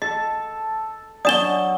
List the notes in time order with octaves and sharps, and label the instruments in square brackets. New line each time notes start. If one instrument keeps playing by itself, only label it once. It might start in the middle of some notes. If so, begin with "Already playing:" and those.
[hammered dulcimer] A4 [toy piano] D#5
[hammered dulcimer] F#3 [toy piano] D4 D#5 D#6 [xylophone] D5 E7 G7